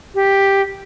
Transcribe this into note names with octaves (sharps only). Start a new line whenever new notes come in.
G4